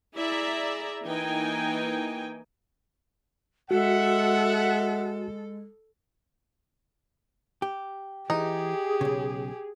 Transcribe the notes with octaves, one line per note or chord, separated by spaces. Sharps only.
E4 G#4 D5 E5 A#5
E3 A#3 D#4 G5 G#5
G#3 F#4 A4 E5 F#5
G4
E3 D#4 G4 G#4
B1 C#3